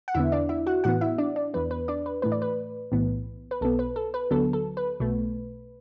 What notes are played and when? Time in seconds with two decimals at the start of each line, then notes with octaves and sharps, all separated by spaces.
0.08 F#5
0.14 E2 D3 B3 E4 E5
0.32 D4 D5
0.49 E4 E5
0.66 F#4 F#5
0.84 A2 E3 B3 F#4 F#5
1.01 E4 E5
1.18 D4 D5
1.36 D4 D5
1.54 E2 E3 B3 B4
1.71 B4
1.88 D4 D5
2.06 B4
2.22 A2 E3 A3 B4
2.32 D5
2.42 B4
2.92 B1 A2 E3 B3
3.51 B4
3.61 B1 B2 B3 A4
3.79 B4
3.96 A4
4.14 B4
4.31 D2 D3 F#3 B3 A4
4.53 A4
4.77 B4
5.00 B1 B2 A3